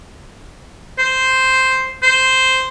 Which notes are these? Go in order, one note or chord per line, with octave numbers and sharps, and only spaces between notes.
C5
C5